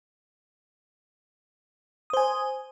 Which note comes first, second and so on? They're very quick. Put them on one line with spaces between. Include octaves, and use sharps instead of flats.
D#6 C5 G#5